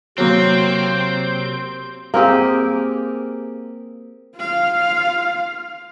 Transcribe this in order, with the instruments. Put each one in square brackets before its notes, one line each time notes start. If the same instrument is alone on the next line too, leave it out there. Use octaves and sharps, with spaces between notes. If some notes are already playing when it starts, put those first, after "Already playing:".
[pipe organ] C3 C6 G6 [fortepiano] F#3 A#3 [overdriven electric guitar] C4
[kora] A#3 C4 G4 G#4
[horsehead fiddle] F4 F5